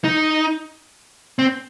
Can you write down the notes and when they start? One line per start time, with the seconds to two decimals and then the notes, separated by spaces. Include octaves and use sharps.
0.04 D#4
1.39 C4